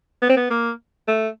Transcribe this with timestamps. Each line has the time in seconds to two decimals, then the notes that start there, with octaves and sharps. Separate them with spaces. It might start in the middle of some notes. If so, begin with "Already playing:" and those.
0.22 B3
0.30 C4
0.37 B3
0.50 A#3
1.08 A3